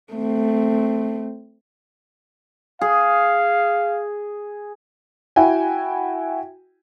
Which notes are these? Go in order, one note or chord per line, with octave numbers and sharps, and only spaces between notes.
A3 C4
G#4 F5
E4 F#4 G5 G#5